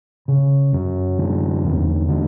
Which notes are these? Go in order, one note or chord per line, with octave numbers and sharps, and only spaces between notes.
C#3
F#2
D3
E2
D3